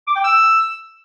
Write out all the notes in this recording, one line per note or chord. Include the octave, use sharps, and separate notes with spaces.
D6
G5
E6